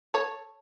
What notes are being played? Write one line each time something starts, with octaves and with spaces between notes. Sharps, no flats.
A4 C#5